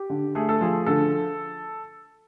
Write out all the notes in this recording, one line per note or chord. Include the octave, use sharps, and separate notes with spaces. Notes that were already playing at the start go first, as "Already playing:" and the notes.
Already playing: G4
D3
A3 G#4
A4
F3 G#4
D3 A4